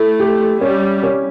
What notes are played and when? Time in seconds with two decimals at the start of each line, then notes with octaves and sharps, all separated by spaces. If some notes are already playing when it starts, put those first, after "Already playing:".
Already playing: A3 E4
0.20 G4
0.61 G3 C#4
1.03 C#4